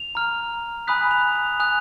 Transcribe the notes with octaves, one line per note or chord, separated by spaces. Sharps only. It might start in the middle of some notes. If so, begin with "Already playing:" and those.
Already playing: F7
A#5 F6
G#5 B5 D#6 F#6 B6
F7
F7
G#5 D#6 F#6 F7